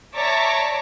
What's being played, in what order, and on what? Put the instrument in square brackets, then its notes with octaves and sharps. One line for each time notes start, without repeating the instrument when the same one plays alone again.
[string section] C#5 D5 E5 A5 A#5 D6